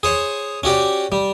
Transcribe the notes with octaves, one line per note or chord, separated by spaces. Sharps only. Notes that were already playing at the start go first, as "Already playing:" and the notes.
G#4 C5 C#5
C#4 F#4 G4 D5
G3